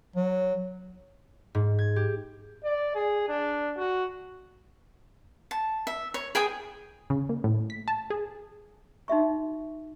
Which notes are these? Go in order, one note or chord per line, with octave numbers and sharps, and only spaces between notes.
F#3
G#2
G#6
G4
D5
G#4
D4
F#4
A5
E5
C#5
G#4 G5 G#5 D#6
C#3
A#3
A2
B6
A5
G#4
D#4 F#4 E5 C#6